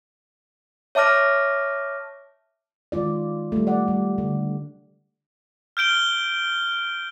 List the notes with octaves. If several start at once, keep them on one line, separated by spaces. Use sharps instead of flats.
C#5 E5 A5 D6 F6 A#6
D#3 G#3 F4 D5
G3 A3
D5 F#5
G3
D3
F6 G6 D7 G7